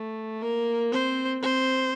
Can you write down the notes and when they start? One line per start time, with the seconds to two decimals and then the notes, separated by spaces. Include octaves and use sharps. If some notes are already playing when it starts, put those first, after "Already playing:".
Already playing: A3
0.42 A#3 A#4
0.92 C4 C5
1.42 C4 C5